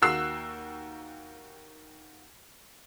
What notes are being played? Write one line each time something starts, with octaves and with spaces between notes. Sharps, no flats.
D#2 A#3 F#4 E6 F#6 C7